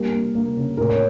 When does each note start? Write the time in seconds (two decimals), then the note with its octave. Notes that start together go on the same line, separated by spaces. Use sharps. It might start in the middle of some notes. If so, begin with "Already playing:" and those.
Already playing: G3 A#3 A#4
0.12 A#3
0.35 A#3
0.57 C#3
0.77 A2 A#4
0.90 C#5